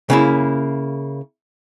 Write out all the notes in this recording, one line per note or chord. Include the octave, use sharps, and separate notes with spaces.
C#3 A#3 E4